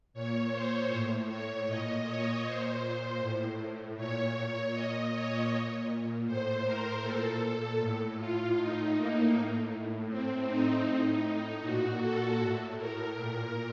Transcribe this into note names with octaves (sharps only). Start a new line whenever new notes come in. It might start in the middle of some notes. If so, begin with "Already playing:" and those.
A#2 C#5
C5
A2
C#5
A#2 D#5
C#5
A#2 C5
A2
A#2 C#5
A#2 D#5
C#5
A#2
A2 C5
A#4
A#2 A4
A2
F4
A2 D#4
A#3
A2
A2 C4
D#4
A2 D#4
A#2 F#4
A4
A2
A#4
A#2 A#4